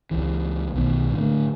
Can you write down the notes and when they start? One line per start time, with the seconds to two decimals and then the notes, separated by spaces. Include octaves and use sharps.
0.11 C#2 E3
0.74 B1 B2 D#3
1.12 A2 D3 A3